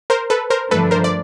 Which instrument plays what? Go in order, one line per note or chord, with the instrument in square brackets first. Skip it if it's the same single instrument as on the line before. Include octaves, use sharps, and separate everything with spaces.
[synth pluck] A#4 C5
A4 B4
A#4 C5
[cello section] G2 D3 F3 A3 D4 [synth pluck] A4 B4
[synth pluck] A#4 C5
D5